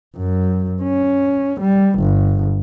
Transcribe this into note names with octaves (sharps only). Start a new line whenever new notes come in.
F#2
C#4
G3
G1